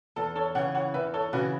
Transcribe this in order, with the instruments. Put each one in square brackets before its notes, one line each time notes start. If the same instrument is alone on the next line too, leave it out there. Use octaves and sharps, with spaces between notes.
[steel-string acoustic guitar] E2 [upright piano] A4
[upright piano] A4 C#5
[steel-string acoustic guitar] C#3 E3 [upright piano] C#5 F#5
[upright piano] C#5 F#5
[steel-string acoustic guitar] E2 [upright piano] B4 E5
[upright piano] A4 C#5
[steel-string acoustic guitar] C#3 [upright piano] F#4 B4
[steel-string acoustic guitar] E3